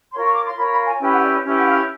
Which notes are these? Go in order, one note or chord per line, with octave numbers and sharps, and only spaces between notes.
F4 A#4 C#5 C6
C#6
D6
C6
F4 A#4 C#5 B5
B5
G#5
C#4 E4 G4 B4 G5
F#5
D5
C#4 E4 G4 B4
F#5
F5